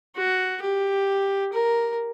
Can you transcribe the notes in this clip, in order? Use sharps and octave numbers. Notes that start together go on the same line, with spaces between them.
F#4
G4
A#4